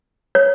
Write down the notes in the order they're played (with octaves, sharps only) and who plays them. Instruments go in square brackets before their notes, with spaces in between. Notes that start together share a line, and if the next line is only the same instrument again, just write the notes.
[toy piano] C#5